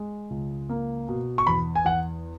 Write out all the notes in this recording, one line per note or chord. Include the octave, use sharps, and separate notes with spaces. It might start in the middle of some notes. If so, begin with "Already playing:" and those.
Already playing: G#3
C#2
A#3
B2
C#6
E2 B5
G#5
E2 F#5